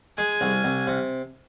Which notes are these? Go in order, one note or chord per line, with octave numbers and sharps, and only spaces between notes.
G#3 G#5
C2
C2
C3